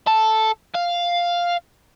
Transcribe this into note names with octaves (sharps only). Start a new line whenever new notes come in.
A4
F5